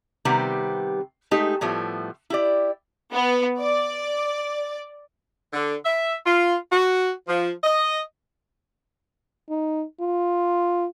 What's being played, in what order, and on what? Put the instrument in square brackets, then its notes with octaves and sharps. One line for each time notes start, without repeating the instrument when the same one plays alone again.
[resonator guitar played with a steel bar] C3 D#3 G3 B3 C4 G4
G#3 A3 D#4 G4
A2 F3 G3 A3 B3
E4 G4 D5
[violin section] B3
D5
[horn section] D3
E5
F4
F#4
F3
D#5
[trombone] D#4
F4